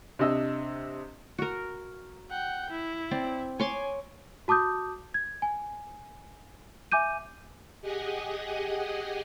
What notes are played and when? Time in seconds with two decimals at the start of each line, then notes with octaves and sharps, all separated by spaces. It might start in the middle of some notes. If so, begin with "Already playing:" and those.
0.19 C3 D4 D#5 E6
1.39 F#4 A#4
2.30 F#5 G5
2.70 E4
3.11 C4 D5
3.60 C#5 G#5 C6 D6
4.48 F#4 A5 D6 D#6 G6
5.14 G#6
5.42 G#5
6.92 E5 G#5 D6 G6 D#7
7.82 G4 G#4 D#5 F#5 G#5